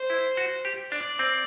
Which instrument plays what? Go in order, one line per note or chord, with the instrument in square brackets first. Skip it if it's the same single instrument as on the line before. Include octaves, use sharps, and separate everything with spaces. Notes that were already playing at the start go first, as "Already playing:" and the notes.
Already playing: [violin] C5
[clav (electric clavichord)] E4
F#4
G4
[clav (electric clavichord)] D4 [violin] D5
[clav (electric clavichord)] C4